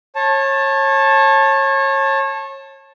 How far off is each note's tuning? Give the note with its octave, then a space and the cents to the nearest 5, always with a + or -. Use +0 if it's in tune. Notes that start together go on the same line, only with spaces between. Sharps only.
C#5 -30 A5 +0